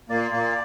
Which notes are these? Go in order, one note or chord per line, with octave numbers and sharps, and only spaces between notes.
A#2 A#3 D5
A#2 A#3